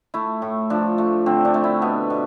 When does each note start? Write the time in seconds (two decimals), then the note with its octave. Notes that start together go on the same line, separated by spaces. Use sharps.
0.14 A3 E4
0.42 A2
0.70 F3 D4
0.98 A3
1.26 D3 C4
1.45 D4
1.54 A3
1.64 E4
1.82 B2 B3
2.10 B2